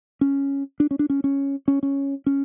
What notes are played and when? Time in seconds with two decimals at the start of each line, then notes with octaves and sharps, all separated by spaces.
0.21 C#4
0.80 D4
0.91 C#4
0.99 D4
1.10 C#4
1.24 C#4
1.68 C#4
1.83 C#4
2.26 C#4